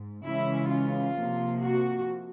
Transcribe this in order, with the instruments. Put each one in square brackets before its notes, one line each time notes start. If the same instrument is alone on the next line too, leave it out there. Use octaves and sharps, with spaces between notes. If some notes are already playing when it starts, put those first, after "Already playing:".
Already playing: [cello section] G#2
C#3 E3 G#3 C#4 E4
F4
C3 F3 A#3
F#4